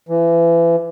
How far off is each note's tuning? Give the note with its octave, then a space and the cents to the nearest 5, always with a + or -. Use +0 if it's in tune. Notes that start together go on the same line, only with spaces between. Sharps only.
E3 +30